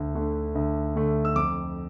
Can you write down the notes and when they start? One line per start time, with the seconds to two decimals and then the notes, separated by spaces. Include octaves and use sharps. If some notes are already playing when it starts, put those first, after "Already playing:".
Already playing: D2
0.15 D3 A3
0.55 D2
0.96 D3 A3
1.25 E6
1.36 F2 D6